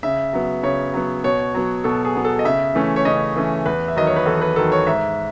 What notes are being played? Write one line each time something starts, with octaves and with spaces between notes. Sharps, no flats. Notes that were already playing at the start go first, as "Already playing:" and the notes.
C#3 E5
F#3 B3
C#3 C#5
F#3 B3
B2 C#5
F#3 B3
B2 A4
G#4
F#3 B3
A4
D#5
C#3 E5
E3 A3 C#4
C#5
C#3 D#5
E3 A3 C#4
E2 B4
E5
D#3 F#3 D#5
C#5
B4
E2 A4
B4
D#3 F#3 A4
C#5
G#2 E5